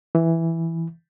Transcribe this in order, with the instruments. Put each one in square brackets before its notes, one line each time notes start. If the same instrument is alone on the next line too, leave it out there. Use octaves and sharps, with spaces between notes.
[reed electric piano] E3